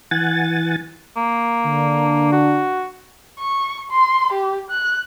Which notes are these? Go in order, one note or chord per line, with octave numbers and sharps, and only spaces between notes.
E3 F#5 G#5 A6
A#3
D3 D4
F#4
C#6
C6
G4
F#6